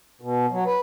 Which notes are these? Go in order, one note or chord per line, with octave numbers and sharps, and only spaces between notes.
B2
F#3
B4